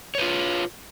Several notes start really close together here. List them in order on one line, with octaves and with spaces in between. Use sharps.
C#5 B4 F4